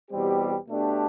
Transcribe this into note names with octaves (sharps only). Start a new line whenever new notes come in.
E2 B2 G3 C4 G4
B2 A3 D4 G4